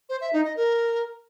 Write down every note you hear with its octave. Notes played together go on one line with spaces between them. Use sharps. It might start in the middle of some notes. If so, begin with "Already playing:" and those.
C5
E5
D#4
D#5
A#4